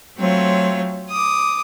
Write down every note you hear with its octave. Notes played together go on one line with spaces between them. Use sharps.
F#3 A3 C4 F4 C#5
D6 D#6